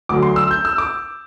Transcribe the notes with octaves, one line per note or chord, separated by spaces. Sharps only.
D2 D3 F#3 D6
C6
E6
G6
E6
D6